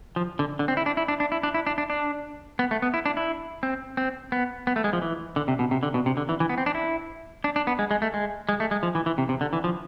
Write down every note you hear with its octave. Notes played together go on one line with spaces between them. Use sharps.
F3
D3
D3
C4
E4
D4
E4
D4
D4
E4
D4
E4
D4
D4
D4
B3
A3
B3
E4
D4
E4
C4
C4
B3
B3
A3
G#3
F3
E3
D3
C3
B2
C3
D3
B2
C3
D3
E3
E3
B3
C4
D4
E4
D4
D4
B3
G#3
G#3
A3
G#3
G#3
A3
G#3
F3
E3
E3
C3
C3
D3
E3
F3